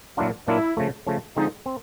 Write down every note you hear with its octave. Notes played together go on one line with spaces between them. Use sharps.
A#2 F#3 A#3 D4 E4 F4
A#2 F#3 A#3 D4 E4 F4
C#3 F3 A3
C#3 F3 A3
D3 F3 G#3 C4 D#4
C4